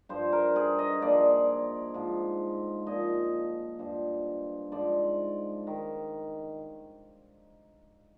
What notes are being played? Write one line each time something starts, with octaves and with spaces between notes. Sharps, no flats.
G2 F3 C5
A#4
G#4
D#5
A#2 F3 D5
G#2 F3
A#2 F3 D#5
G2 F3
G#2 F3 D5
D#3